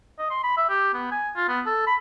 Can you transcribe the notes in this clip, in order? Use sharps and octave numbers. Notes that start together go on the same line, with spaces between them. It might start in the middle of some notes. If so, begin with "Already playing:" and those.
D#5
C6
B5
E5
G4
B3
G#5
F4
B3
A4
B5